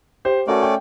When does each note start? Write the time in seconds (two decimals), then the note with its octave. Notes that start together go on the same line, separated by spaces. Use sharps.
0.25 G4 C5
0.47 A3 C#4 F#4 A#4 D5
0.63 G5